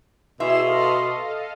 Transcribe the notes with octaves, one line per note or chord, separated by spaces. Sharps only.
B2 E4 G#4 E5 C6 E7
A4 D#5 F5